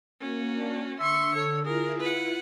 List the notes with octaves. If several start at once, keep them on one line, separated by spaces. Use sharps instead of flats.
A#3 C#4 F#4
D4
D3 E5 C6 C#6
A4 C#5
E4 F4 G#4 A#4
B4 F#5